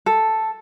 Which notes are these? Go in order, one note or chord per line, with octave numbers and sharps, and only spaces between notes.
A4